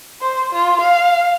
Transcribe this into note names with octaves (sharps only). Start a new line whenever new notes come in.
C5
F4
F5